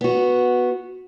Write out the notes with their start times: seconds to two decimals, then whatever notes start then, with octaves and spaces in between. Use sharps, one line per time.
0.01 B3 F#4